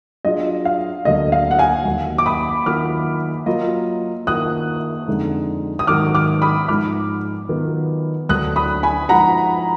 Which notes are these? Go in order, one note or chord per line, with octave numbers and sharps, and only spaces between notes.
F#3 D4 F4 G#4 D#5
F5
D2 D3 F#3 A#3 D#5
F5
F#5
F5 G#5
D#2 D#3 F#3
D6
B5 D#6
D#3 F#3 A#3 F4 D6 F6
F#3 A#3 F4 A#4 D#5
D#3 A#3 F4 A#4 D#5 D#6 F#6
F2 D3 G#3 D#4
D#6
G#2 D#3 F#3 D6 F6
D6 F6
B5 D#6
G#2 F3 G#3 D#4 D6 F6
D#3 F#3 B3 F4 B4
D2 D3 F#3 D4 D#6 F#6
B5 D#6
G#5 B5
F3 G#3 D#4 F#4 F#5 A#5